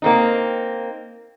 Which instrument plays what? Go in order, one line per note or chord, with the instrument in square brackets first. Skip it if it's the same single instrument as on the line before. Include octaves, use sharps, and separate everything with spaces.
[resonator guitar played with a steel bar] A#3 C4 D#4